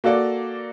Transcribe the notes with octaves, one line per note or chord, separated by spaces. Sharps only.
A#3 F#4 A4 D5